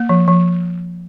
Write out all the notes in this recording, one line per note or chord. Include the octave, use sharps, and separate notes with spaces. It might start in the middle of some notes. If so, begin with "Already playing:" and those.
Already playing: A#3
F3
F3